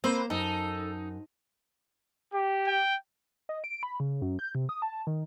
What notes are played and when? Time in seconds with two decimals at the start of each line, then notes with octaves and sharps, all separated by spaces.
0.04 A#3 C4 B4 C5
0.30 F#2 D#4 A4
2.34 G4
2.67 G5
3.49 D#5
3.64 D7
3.83 B5
4.00 C#3
4.22 F#2
4.39 G6
4.55 C3
4.69 D#6
4.82 A5
5.07 D#3